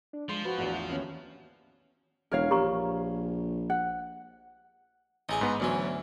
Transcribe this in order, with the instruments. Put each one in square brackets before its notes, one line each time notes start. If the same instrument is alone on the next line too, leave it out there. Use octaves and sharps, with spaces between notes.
[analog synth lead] D4
[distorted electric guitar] F3 [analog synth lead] G#3 [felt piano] C6
[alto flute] F#4 [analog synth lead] B4 [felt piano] C5 B5
[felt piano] A1 E2 D4
[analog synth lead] E5
[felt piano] D#2 B3 [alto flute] C#4
[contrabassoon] E1 [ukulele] A#4 C#5 F5
[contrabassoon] A#1 [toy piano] G4 A#5 C#6
[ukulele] F#5
[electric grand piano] A1 [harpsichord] D#4 G#4 G#5
[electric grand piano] G#2 B3
[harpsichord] D2 E3 C#4 [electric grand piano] F#3 B3 D5